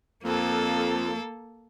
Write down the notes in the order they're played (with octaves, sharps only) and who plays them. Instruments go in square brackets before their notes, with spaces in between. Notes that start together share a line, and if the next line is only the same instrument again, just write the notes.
[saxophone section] F2 [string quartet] A#3 A4